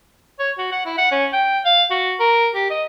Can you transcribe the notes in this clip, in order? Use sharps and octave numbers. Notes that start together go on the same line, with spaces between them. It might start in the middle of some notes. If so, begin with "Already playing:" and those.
C#5
F#4
F#5
E4
F#5
C#4
G5
F5
F#4
A#4
G4
D#5